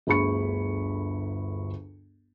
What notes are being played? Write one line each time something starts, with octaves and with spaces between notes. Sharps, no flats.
G1 D2 G#4 B5 C#6 C#7